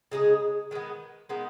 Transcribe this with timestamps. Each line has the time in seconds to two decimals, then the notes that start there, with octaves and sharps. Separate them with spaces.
0.12 C#3 G#3 D#4 G#4
0.71 D#3 G#3 B3
1.29 G#3 B3 D#4 A#4